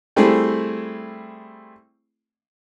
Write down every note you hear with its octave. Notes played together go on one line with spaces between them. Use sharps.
G3 A3 C4 E4 G#4